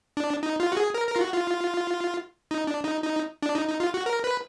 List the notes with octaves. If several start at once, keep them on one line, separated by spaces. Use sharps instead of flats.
D4
D#4
F4
F#4
G#4
A#4
A#4
F4
F#4
F4
D#4
D4
D#4
D#4
D4
D#4
D#4
F4
F#4
A#4
B4